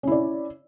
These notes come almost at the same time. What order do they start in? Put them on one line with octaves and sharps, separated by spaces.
C#4 E4 D5